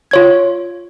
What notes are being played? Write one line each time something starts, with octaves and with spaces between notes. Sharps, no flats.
F4 C#5 G#6